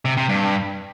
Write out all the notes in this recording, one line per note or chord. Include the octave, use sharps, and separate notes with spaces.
C3
C3
G2